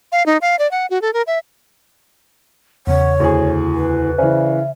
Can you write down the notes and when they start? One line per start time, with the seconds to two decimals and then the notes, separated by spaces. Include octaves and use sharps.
0.12 F5
0.26 D#4
0.41 F5
0.59 D5
0.71 F#5
0.90 F#4
1.02 A4
1.13 A#4
1.27 E5
2.87 E2 C#3 C#5 F#5
3.20 D2 E4 G#4
3.75 B4
4.18 C#3 E3 C5 D5 E5 G#5